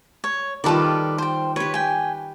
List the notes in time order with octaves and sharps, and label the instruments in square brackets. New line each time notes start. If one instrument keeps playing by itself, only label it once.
[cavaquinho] C#5
[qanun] D#3 G3 F4 [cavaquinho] A4 B4 D5
[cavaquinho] C5 G5
[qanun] G4 B4 [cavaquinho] C#5
[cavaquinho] G5 G#5